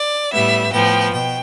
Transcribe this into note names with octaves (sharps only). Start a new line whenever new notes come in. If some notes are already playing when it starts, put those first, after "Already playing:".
Already playing: D5
A2 G3 B3 E5
A2 F3 B3 G5
B2 G5